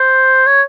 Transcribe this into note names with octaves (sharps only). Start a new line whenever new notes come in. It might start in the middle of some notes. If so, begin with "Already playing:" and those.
Already playing: C5
C#5